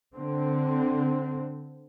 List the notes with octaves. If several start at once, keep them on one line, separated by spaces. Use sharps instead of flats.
D3 C4